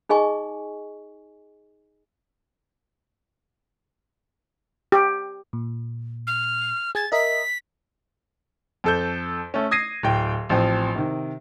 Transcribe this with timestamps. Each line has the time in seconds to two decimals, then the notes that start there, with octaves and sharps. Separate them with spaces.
0.09 D#4 G#4 D#5 G#5 C#6
4.92 G4
5.53 A#2
6.26 F6
6.95 G#4 G#6 A6
7.12 A#4 D#5 E5 B6
8.84 F2 A4 G6
9.54 A3 C#4
9.71 D#6 G#6 A#6 C7 D#7
10.03 D1 G5
10.49 A1 F3 C4
10.95 C3 D#3